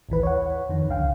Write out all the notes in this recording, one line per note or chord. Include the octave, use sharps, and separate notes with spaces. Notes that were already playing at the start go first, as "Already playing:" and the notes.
A1 D#2 E3 B4
C#5 F#5
F2 D#3
C#2 D3 F5 G5